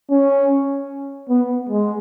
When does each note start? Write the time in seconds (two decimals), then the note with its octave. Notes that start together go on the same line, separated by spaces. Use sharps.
0.11 C#4
1.29 B3
1.69 G#3